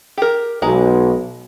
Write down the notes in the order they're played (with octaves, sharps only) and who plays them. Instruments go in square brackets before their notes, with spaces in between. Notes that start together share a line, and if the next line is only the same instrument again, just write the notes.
[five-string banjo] G4 A#4
[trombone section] B1 [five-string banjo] G#3 A#5